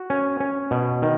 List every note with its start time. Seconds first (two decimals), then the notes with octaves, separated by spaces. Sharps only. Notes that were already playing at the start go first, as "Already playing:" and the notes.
Already playing: F#4
0.10 C#4
0.40 C#4
0.71 B2
1.02 D#3